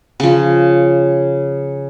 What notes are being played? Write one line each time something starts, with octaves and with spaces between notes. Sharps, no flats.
C#3 F3